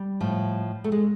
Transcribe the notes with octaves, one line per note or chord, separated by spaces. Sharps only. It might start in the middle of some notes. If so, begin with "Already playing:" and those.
Already playing: G3
A2 F3
A3
G#3